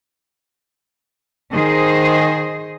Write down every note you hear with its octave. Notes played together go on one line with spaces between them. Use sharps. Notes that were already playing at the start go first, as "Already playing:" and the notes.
D#3 G#4 C5 D#5